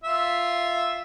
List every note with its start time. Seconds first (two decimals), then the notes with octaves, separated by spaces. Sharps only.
0.04 F4 E5